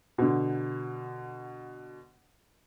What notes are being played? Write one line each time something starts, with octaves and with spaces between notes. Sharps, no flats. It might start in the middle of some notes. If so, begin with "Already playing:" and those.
B2 D3